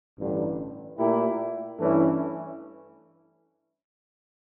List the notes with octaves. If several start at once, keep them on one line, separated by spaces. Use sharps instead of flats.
A1 G2 D3
A#2 A3 E4 G4 A#4
G2 E3 A3 C#4 E4